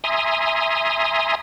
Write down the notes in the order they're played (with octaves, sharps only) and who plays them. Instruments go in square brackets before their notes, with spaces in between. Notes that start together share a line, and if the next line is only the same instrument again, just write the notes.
[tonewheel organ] E5 G#5 A#5 C6 D#6